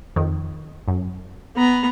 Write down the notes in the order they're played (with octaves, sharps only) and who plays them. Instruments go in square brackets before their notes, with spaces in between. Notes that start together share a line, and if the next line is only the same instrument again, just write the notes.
[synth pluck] F2 D#3
F#2
[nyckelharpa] B3 A#5